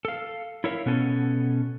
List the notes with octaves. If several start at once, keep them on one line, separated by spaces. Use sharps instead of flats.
A4 F5
E4 A4 A#4 C#5 E5 F5
B2 B3 C#4 A4